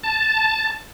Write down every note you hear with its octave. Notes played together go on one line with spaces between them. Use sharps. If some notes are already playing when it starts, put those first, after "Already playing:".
A5